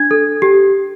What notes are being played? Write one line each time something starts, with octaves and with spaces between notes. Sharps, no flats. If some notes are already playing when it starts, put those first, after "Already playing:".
Already playing: D4 G#6
A4
G4